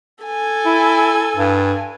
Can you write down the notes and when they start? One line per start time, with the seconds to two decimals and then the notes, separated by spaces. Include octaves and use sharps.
0.24 A4 G#5
0.65 E4
1.36 G2